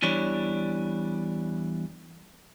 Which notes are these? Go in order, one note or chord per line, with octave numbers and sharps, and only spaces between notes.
E2 E3 G3 D4 C#5